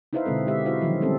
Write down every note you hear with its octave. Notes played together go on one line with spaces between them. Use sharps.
D#4 E4 B4 C5 E5 F5
B2 D3 G#3 C4 A4
G#3 G4 E5
E4 F#4 C5 D#5 F5
D#3 F3 F#3 F4
G3 G#3 C4 C#4 A4